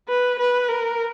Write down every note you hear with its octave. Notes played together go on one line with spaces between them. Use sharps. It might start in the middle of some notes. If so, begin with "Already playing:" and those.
B4
B4
A#4